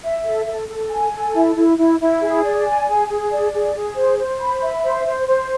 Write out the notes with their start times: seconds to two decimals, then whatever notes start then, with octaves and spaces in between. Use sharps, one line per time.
0.03 E5
0.25 A4
0.46 A4
0.68 A4
0.90 G#5
1.12 A4
1.34 E4
1.55 E4
1.78 E4
2.00 E4
2.21 G#4
2.43 D5
2.65 G#5
2.87 G#4
3.09 G#4
3.30 D5
3.53 G#4
3.75 G#4
3.96 C5
4.18 C5
4.40 B5
4.62 E5
4.84 C5
5.06 C5
5.28 C5